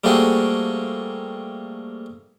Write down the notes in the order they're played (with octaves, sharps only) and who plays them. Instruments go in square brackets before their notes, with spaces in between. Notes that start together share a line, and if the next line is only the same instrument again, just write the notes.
[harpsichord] G3 A3 A#3 C4 F#4 G#4